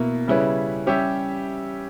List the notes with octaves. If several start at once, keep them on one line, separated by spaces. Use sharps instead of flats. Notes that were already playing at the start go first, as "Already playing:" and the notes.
Already playing: B2 A#3 E4
C#3 G3 C#4 E4 B4
G3 C#4 G4 C#5 E5